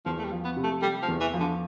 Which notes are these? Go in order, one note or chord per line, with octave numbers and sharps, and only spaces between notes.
E2 F3
A3
G3
F3
B3
C3
A3
G3 A3
F3
E2
E3
F3
D3